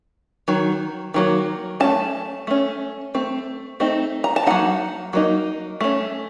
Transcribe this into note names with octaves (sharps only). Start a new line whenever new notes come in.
D#3 F#3
D#3 F#3 A#3
A3 C#4 A5
A3 C#4
A3 C4
A3 C4 D#4
A#5
A5
F#3 A#3 D#4 F#5
F#3 A#3 D#4
A3 C#4